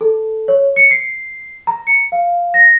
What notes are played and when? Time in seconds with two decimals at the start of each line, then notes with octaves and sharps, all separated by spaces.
0.01 A4
0.48 C#5
0.76 C#7
0.91 C7
1.67 A#5
1.87 C#7
2.12 F5
2.54 A#6